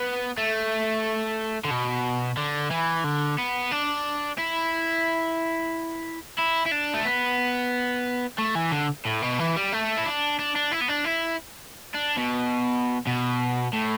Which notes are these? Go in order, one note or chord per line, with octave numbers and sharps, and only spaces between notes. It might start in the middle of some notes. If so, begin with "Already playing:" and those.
Already playing: B3
A3
D3
B2
D3
E3
D3
B3
D4
E4
E4
E4
D4
A3
B3
A3
E3
D3
A2
B2
E3
G3
A3
E4
D4
D4
D4
E4
B3
D4
E4
D4
B2
B2
A2